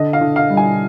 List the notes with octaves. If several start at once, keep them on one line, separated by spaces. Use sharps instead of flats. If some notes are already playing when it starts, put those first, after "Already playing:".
Already playing: D3 D#5
F5
D3
F5
G3
G#5